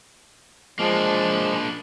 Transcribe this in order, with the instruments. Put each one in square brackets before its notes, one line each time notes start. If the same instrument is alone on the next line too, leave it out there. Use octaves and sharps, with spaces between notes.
[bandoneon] F3 G#3 [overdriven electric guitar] A#3 D4